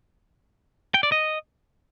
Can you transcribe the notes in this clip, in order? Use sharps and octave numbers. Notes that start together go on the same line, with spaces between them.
G5
D5
D#5